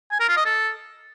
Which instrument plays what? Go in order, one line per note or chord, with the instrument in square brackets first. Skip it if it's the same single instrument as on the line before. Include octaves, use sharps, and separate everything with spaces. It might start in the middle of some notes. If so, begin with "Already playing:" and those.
[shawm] G#5
A#4
F4
D#5
A4